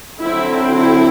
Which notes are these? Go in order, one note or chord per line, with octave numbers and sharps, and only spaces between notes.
D3 F#3 C4 E4
E4